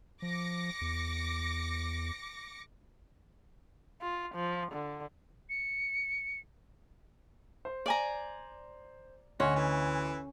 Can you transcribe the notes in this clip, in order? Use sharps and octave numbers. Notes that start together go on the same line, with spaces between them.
F3 D6 A#6 C#7
E2
F4
F3
D3
C#7
C5
D5 G#5 A#5
D2 C#4 F#4 D#5 C6
E3